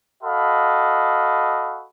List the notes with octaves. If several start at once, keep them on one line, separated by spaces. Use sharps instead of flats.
F#4 A4 D#5 F5 B5